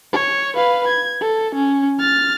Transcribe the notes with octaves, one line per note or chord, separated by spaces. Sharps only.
C#5
B4 F5
G#6
A4
C#4
F6 A6